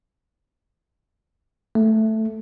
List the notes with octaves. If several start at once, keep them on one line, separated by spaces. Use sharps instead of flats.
A3